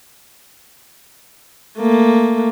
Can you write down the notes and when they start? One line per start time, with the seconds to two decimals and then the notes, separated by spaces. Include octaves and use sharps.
1.78 A3 A#3